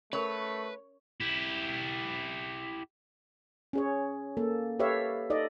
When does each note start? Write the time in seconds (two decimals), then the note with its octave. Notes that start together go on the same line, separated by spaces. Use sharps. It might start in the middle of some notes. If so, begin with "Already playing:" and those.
0.13 A3 C#4 A#4 B4 C#5
1.21 E4 G4
3.73 C#4 G#4 C#5
4.37 A#3 A4
4.80 G4 A4 B4 C#5 E5 F5
5.30 D#4 A4 D5 D#5